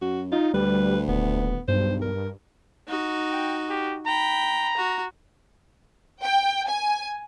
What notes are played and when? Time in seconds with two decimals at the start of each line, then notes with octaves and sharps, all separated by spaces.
0.02 F#2 F#4
0.32 D#4 F4
0.54 D2 G3 B4
1.08 D#1 B3
1.68 B1 G2 C5
2.02 A#4
2.88 D#4 F#4
3.31 G5
3.69 G4
4.06 G5 A#5 B5
4.77 F#4
6.22 G5
6.67 G#5